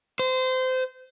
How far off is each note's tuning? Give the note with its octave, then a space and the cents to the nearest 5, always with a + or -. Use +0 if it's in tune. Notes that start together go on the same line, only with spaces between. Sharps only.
C5 -25